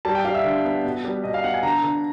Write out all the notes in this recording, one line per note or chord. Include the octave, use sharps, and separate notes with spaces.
G3 A5
G5
G3 F5
E5
D3
B3
B2
G3
B2 D#5
F5
B3 F#5
G#5
D3 A#5
D3